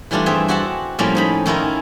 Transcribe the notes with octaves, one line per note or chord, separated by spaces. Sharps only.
E3 G3 A3 D4 F4
G2 C4 G#4 E5 G5
C4 F#4 E5 F#5 A5
A2 F3 G3 A#3 C4 C#4
F3 D#4 B5
D#3 C#4 E4 F4 A#4